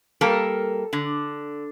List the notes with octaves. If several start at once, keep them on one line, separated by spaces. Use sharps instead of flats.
G3 A#3 A4 A#4
D3